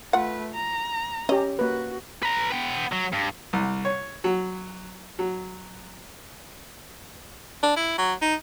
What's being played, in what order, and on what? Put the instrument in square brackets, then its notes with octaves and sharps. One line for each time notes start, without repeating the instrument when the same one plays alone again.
[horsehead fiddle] A3 B4 [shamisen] F4 F#5
[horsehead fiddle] A#5
[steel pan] C#4 G4 [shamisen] D#5
[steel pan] A#3 B4 [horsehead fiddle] F#4
[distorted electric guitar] B4 A#5
B3 G5
F#3
G2
[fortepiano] C2
C#5
F#3
F#3
[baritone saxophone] D4
E4
F#3
D#4